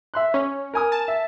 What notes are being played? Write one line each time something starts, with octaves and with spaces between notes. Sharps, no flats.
E5 C6 F#6
C#4 C#5
A#4 G#5 D#6
A5
E5